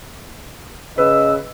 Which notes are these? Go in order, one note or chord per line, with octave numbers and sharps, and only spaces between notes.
C#3 B4 D#5 E6